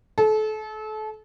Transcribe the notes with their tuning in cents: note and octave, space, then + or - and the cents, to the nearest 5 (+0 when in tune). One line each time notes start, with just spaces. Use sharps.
A4 -30